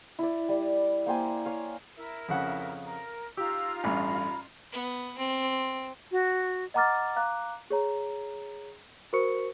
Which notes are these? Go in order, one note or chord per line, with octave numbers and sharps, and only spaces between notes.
E4 D5
G3
A#3 C5 G5 G#5
C#5 F5
E4 A#4
F2 C#3 F#5
A#4
D#4 F4 G4 A#5 E6
A1 G2 B5
B3
C4
F#4
D#5 F#5 A#5 D6 F6 A6
F5 A#5 D6 F#6
G#4 C#5 A#5
F#4 A#4 C5 C#6 C#7